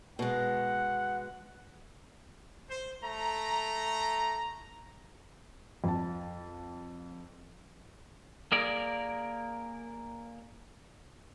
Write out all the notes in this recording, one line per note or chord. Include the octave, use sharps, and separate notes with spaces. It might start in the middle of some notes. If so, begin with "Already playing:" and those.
B2 G#3 F#5
C5
A3 A#5
F2 A5
A#3 G#4 A#4 D5